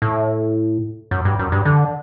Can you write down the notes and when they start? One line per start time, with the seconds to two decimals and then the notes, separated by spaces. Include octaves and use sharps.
0.02 A2
1.11 F#2
1.25 G2
1.39 F#2
1.52 G2
1.65 D3